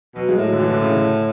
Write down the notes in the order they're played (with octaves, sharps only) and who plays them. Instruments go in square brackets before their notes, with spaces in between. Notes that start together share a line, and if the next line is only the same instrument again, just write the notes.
[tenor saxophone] B2 [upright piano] F#3
[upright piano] G#3
[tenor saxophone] A2 [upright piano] F#3
[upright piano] D3
E3
D3
C#3
D3